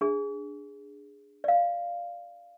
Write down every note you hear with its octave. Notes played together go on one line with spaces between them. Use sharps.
D4 G#4
D5 F5